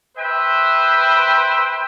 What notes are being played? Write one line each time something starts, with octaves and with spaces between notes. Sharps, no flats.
B4 C5 E5 G5